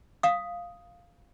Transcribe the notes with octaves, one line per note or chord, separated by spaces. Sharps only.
F5 D#6